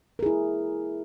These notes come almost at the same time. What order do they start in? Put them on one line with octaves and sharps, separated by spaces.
A#4 G#4 E4